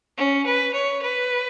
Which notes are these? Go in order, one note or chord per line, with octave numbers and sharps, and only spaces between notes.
C#4
B4
C#5
B4